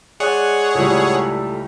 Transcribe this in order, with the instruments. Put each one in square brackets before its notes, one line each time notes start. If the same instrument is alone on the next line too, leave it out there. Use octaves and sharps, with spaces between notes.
[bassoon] G#3 [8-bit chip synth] G#4 C#5 F#5 [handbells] D5 G#5 F#6
[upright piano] C#2 A2 G3 [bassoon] A4